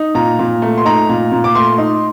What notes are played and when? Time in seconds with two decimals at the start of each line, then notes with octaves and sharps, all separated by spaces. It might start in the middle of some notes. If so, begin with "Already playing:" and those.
Already playing: D#4
0.15 A#2 A#5
0.39 A#2
0.62 A3
0.78 C6
0.85 D#4 A#5
1.09 A#2
1.32 A#2
1.44 D6
1.55 A3 C6
1.78 D#4